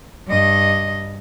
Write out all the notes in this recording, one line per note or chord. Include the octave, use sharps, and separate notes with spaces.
G2 D#5